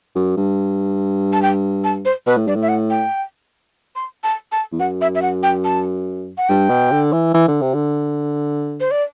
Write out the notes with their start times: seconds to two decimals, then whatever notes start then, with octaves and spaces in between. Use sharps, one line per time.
0.15 F#2
0.37 G2
1.33 A5
1.42 G5
1.84 A5
2.05 C5
2.27 B2 B4
2.37 A2
2.47 G2 D5
2.55 A2
2.62 E5
2.69 F#5
2.90 G5
3.96 C6
4.23 A5
4.52 A5
4.72 E2
4.80 F#2 F#5
5.01 E5
5.15 E5
5.22 F#5
5.43 G5
5.64 A5
6.38 F#5
6.49 G2 G5
6.69 B2
6.92 D3
7.12 E3
7.34 E3
7.48 D3
7.62 C3
7.74 D3
8.80 C5
8.91 D5